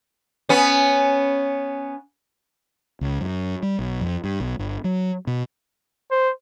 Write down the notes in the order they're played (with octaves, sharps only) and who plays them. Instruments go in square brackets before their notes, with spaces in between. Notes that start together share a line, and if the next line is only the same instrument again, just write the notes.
[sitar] B3 C#4
[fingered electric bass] C#2
F#2
G3
B1
F2
G2
B1
G1
F#3
B2
[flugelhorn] C5